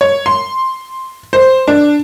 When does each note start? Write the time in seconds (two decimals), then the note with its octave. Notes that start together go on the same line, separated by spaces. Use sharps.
0.01 C#5
0.26 C6
1.33 C5
1.68 D4